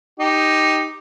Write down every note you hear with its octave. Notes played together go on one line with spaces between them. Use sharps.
D#4 G4